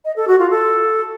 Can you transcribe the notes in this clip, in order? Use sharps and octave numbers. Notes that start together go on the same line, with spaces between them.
D#5
A4
F#4
F4
A4